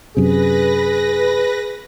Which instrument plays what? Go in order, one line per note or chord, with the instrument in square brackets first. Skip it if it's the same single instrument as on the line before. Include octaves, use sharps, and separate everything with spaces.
[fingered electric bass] F#2 C3 [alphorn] G#4 [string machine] B4 A#6